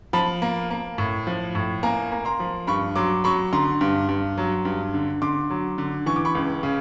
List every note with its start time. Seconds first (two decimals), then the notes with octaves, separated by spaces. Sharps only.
0.13 F3 A5 B5
0.42 A#3
0.70 A#3
0.98 A2
1.27 F3
1.55 A2
1.83 A#3 G#5 A#5
2.12 A#3
2.25 A#5 C6
2.40 F3
2.67 G2 B5 C#6
2.96 F#3 C6 D6
3.24 F#3 B5 C#6
3.53 D3 A#5 C6
3.81 G2
4.09 G2
4.38 F#3
4.65 G2
4.94 D3
5.22 D3 C6 D6
5.50 F#3
5.78 D3
6.06 E3 C#6
6.16 D6
6.25 B5 C#6
6.35 C#2
6.63 C#3